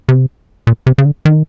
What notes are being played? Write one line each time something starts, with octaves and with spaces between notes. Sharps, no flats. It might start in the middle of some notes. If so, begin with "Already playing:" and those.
C3
A#2
C3
C#3
D3
D#3